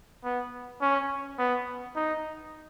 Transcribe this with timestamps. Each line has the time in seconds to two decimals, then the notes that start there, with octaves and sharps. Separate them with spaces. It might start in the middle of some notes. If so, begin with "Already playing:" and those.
0.24 B3
0.82 C#4
1.38 B3
1.96 D#4